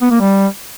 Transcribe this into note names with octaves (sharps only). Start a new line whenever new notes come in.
B3
A#3
G3